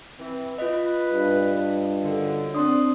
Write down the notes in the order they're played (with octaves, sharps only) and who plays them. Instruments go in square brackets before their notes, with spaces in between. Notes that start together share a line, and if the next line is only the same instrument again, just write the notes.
[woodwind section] E3 C4
[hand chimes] F4 D#5 [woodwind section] B4
[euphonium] G2
[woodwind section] F#2 D3
[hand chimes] C4 C6 D#6 [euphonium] D4